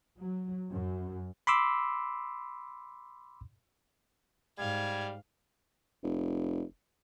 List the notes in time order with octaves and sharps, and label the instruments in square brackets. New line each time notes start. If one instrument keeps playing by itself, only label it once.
[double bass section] F#3
F#2
[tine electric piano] B5 C6 D6 E6
[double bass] G#2 [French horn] G3 [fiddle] F5 [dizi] G#6
[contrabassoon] F1